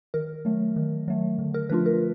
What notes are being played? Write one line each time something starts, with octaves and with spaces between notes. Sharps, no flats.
D#3 A#4
F#3 A3
D#3
F#3 A3
D3
A#4
F3 A3 D4 F4 B4
A#4